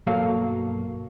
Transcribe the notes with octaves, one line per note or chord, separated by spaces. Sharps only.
B1 G2 F#3 A#3 A4 F5